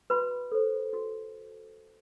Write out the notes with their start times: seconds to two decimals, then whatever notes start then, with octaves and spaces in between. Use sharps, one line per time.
0.10 F#4 B4 B5
0.52 A4 C5
0.93 F#4